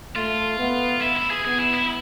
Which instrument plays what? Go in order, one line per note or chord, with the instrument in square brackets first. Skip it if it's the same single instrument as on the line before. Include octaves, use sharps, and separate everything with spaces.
[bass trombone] A3 [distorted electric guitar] F4
[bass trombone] B3
[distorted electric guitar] E4
E4
G#4
[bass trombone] B3 [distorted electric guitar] G#4
[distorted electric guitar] E4
E4